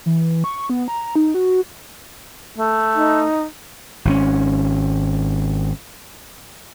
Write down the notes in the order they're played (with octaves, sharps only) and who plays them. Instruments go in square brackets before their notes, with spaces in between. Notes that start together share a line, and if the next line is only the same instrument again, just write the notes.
[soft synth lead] E3
C#6
B3
A#5
D#4
F#4
[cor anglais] A3
[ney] D#4
[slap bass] G#1 C#3 C#4